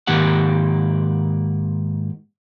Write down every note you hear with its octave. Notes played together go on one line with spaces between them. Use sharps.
G#2 D#3 A#3 G4 F#5